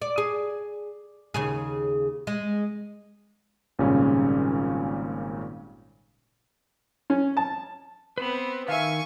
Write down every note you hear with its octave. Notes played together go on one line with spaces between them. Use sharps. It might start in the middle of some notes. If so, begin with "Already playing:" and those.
D5
G#4
D#2 C#3 G#4
G#3
G#1 A#2 C#3 G3 C#4
C#4
A5
B3 C4 B4 C5 B5
D#3 E5 F5 G#5 C#6